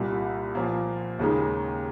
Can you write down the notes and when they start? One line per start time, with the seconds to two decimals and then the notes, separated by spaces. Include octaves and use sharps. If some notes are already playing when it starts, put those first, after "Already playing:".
Already playing: C2 A#2 G3
0.55 A#2 F3 A#3
1.19 D#2 C#3 G#3 D#4